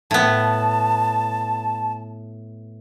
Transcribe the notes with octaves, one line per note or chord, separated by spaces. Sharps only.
A2 B3 A5